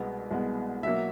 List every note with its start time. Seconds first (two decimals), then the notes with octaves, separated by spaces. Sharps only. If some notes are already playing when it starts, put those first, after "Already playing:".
Already playing: C2 B2 G#3 B3
0.31 C2 B2 G#3 B3
0.83 B2 F#3 A#3 E5